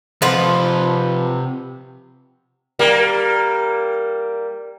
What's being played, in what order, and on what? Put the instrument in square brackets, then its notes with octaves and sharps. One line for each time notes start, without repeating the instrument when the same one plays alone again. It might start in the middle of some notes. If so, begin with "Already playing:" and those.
[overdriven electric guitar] C3 F#5 [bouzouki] F3 B4
[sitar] G3 A#3